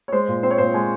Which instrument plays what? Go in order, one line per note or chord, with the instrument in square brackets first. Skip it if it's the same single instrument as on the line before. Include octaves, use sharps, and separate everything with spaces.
[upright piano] C#5
G#3 C5
A#2
C4 C5
C#5
A#2 C5
G#3 G#5